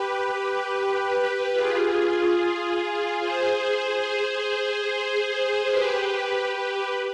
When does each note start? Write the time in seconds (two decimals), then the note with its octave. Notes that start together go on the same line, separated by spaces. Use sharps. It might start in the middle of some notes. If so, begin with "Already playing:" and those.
Already playing: G4 B4
1.53 F4 G#4
3.20 G#4 C5
5.69 G4 B4
6.53 G4 B4